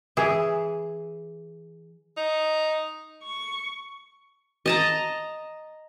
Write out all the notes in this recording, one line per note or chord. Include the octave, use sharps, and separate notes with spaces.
E3 G#4
D#4
C#6
D#5 A5 A#5